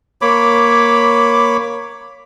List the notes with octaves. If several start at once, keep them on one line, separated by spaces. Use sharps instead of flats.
A#3 C#5 B5 D6